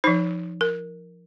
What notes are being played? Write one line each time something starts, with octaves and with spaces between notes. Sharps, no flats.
F3 D#4 C5
A#4